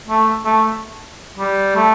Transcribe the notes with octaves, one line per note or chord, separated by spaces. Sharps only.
A3
A3
G3
A3